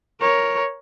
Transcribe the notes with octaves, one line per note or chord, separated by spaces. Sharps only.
A#4 C#5